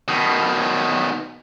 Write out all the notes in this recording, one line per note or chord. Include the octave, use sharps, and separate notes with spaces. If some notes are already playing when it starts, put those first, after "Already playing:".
B2 D#3